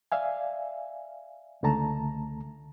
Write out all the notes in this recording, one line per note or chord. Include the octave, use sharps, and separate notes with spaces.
D5 E5 F5 G#5
C#2 D3 A3 A5 A#5